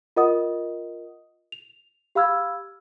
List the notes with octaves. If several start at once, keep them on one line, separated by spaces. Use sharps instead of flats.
F4 A#4 D#5 F#5 D#6
F7
G4 F5 B5 E6 F6 G#6